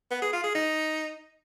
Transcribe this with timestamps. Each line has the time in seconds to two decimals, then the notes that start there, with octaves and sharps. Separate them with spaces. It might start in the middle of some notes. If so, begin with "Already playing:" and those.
0.11 B3
0.22 G#4
0.33 F4
0.44 G#4
0.55 D#4